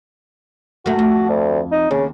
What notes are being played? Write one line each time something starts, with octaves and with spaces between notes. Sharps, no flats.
F#2 A3 F#4
F2
D2
D#4
D#2 C#3